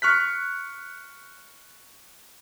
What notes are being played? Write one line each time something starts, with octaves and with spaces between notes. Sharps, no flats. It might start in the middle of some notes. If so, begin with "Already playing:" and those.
C#6 F6 F#6 B6